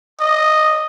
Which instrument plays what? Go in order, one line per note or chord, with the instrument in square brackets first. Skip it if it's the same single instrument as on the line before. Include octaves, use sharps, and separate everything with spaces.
[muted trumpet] D#5